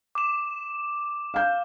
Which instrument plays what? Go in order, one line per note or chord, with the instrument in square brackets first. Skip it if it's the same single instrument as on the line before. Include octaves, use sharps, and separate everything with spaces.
[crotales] D6 E7
[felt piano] F5 G6